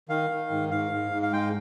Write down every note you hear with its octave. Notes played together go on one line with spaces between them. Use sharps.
D#3 F5
D#3
G#2
G#2 F5
G#2
G#2
F5
G#3 G5